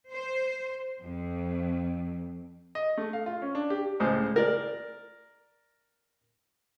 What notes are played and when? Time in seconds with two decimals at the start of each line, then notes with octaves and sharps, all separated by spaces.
0.10 C5
1.02 F2
2.75 D#5
2.98 A3
3.13 F5
3.26 F4
3.42 C#4
3.55 D4
3.70 G4
4.00 C#2 A2 G#3 C5
4.36 A#4 D5